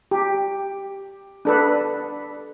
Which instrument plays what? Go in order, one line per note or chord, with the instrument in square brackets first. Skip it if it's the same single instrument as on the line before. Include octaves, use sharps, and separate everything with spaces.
[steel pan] G4
D4 A4 B4